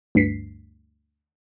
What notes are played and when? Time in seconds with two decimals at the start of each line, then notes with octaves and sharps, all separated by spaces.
0.15 D2 G2 B6 C7